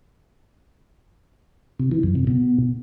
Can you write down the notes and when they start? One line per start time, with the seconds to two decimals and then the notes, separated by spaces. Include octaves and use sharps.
1.80 C3
1.91 E3
2.03 F#2
2.15 C3
2.27 B2